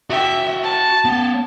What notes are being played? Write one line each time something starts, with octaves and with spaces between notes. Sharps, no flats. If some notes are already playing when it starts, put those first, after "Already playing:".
F#4 E5 G5
A5
B3 C#4